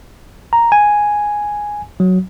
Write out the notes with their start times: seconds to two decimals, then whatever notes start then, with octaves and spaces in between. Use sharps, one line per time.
0.53 A#5
0.72 G#5
2.00 F#3